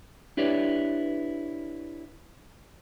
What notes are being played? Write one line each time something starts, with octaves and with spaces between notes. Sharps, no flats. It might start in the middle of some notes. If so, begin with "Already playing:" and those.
D4 E4 G4 B4 C#5 D5